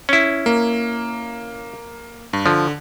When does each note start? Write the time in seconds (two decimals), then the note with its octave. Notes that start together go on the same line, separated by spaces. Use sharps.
0.09 C#4 E4
0.46 A#3
2.33 G2
2.46 D3 F3